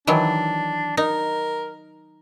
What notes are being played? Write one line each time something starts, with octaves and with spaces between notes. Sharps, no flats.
D#3 E3 F#3 D4
D#4 A#4